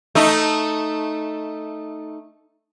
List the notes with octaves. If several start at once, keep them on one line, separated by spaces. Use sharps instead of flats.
A3 D#4